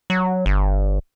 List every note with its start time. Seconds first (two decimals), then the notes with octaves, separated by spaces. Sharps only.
0.10 F#3
0.46 G1